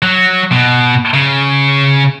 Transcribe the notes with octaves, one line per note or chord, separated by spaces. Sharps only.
F#3
B2
C#3